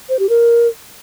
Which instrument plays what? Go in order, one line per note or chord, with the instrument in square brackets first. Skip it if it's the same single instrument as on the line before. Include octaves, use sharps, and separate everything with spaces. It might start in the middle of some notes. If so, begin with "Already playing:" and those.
[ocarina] C5
G4
A#4